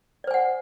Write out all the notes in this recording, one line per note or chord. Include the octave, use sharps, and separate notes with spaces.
C5 D5 F#5 G#5